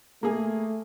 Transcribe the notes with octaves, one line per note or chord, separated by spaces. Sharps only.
A3 A#3 G#4